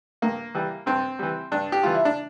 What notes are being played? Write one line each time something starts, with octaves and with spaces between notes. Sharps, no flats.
G2 A#3
E3 G3
G2 C4
E3 G3
G2 D4
G4
E3 G3 F4
E4
D4